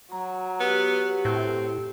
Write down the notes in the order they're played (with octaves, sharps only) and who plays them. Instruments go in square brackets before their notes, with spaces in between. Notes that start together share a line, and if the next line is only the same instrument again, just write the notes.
[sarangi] F#3 [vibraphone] A#5
[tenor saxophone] B3 [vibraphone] G4
[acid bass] A2 [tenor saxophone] C4